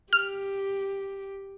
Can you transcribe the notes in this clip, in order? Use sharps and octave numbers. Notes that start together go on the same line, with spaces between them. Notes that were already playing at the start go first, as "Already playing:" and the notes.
G4 F6